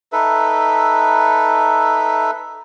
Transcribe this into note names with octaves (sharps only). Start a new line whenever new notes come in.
D#4 A4 B4 E5